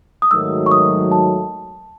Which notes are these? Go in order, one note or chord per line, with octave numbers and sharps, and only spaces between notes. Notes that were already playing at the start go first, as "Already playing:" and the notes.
D#6
G#2 D#3 F#3 A3 E6
C#6
D#6
A5